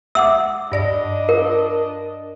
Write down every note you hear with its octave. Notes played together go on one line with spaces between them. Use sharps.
E5 F#5 D6 E6
G2 D4 D5 D#5 A#6
A#4